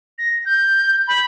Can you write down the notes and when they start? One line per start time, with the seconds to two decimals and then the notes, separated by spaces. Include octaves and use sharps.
0.18 A#6
0.45 G6
1.08 B5